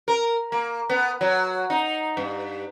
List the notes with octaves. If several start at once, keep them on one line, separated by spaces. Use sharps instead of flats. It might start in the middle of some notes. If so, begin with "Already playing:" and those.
A#4
A#3
B3
F#3
D#4
G2